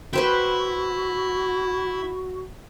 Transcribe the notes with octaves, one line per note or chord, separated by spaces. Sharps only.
E4 F#4 B4 C5 G5